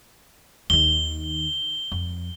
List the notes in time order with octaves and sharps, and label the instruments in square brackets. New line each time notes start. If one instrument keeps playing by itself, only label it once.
[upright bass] D#2 D#3 [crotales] G7
[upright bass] F2